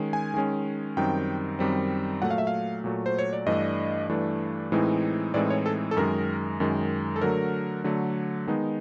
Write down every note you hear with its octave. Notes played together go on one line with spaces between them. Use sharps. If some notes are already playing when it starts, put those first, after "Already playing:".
Already playing: D#3 G#3 C#4
G#5
D#3 G#3 C#4
F#2 D#3 G3 C4 G5
F#2 D#3 G3 C4
A#2 F#3 A3 F#5
F5
E5
F5
A#2 F#3 A3
C5
C#5
D5
G2 E3 A3 D4 D#5
G2 E3 A3 D4
A2 E3 G#3 C4 D#4
A2 E3 G#3 C4 D#4 D5
C#5
A4
A4
F#2 D#3 G#3 A#4
F#2 D#3 G#3
A4
D3 F#3 A3 A#4
D3 F#3 A3
D#3 G#3 B3 D#4